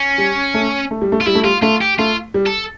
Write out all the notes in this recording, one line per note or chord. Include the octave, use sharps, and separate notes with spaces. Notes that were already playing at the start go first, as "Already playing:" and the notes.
Already playing: C#4
G3
A3
A3
G3
A3
F4
G3 E4
A3
G3 F4
A3 F4
G4
A3 F4
G3
A4